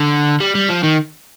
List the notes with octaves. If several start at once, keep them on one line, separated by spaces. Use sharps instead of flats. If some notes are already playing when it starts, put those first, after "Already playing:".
Already playing: D3
G3
G3
F3
D#3